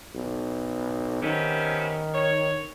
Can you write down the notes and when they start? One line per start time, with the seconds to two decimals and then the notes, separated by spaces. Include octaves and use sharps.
0.14 B1
1.22 C3 D#3 B3 C#4
2.14 C#5